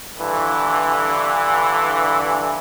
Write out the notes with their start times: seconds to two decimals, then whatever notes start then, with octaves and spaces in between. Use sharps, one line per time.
0.19 G2 D3 E3